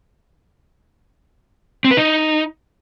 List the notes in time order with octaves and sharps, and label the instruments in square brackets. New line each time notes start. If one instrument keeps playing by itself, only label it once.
[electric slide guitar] C4
B4
D#4